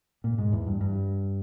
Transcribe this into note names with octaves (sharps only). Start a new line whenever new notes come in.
A#2
G#2
E2
G2
G2